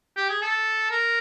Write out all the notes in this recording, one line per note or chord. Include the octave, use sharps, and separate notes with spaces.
G4
G#4
A4
A#4